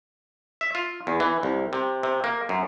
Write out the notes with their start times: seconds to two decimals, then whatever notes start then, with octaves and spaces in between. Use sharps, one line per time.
0.61 E5
0.75 F4
1.07 E2
1.20 E3
1.43 C2
1.73 C3
2.03 C3
2.24 A#3
2.49 F#2